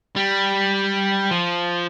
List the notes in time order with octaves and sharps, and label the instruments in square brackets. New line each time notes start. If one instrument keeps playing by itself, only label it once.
[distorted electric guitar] G3
F3